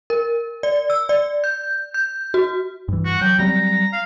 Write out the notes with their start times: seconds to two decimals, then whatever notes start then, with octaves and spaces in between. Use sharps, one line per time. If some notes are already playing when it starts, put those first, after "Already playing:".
0.10 A#4
0.63 D5
0.90 E6
1.09 D5
1.44 G6
1.94 G6
2.34 F#4
2.88 G2 E3
3.05 F#4
3.21 F#3 G5
3.38 F#3 G3 C4 A#5
3.93 F5